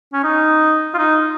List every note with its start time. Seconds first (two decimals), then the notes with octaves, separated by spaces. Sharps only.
0.13 C#4
0.23 D#4
0.94 F4
0.98 D#4